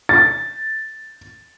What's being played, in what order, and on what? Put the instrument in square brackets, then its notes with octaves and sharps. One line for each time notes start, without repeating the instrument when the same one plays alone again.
[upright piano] A6